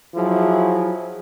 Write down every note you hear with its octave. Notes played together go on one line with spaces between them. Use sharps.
F3 F#3 E4 G#4